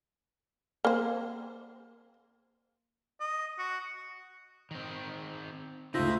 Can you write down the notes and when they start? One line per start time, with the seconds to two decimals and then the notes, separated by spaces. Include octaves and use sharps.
0.85 A#3 C5
3.20 D#5
3.58 F#4
4.71 D#3 C4
5.94 D2 C#3 D#4 F4 C5 E5 F5 A#6